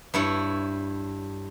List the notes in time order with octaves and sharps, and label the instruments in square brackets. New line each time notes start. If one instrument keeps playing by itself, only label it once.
[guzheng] G2 E4 C#5